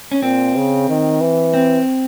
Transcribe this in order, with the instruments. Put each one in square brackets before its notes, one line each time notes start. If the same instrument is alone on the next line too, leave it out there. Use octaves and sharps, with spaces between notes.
[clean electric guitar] C#4
[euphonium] A#2 [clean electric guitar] C4
[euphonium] C#3
D#3
E3
[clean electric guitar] C4